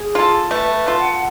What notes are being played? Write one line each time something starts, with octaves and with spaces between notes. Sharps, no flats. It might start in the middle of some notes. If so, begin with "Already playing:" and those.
Already playing: G#4
F4 A4
A3 B4
B4
F4 A4
F#5